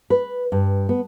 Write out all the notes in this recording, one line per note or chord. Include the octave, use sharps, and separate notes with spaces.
B4
G2
B3